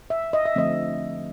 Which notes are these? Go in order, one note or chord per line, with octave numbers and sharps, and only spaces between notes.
E5
D#5
E5
D3 F3 A3 C4 D#5